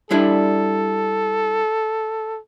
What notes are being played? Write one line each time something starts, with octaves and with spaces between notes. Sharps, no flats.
G3 D4 E4 A4